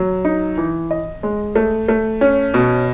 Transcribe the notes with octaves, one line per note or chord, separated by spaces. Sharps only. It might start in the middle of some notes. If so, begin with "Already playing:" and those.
Already playing: F#3
D#4
E3
D#5
G#3
A3
A3
C#4
B2